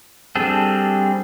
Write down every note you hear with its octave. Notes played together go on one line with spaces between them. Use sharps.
G3 C4 D4 G#4 A4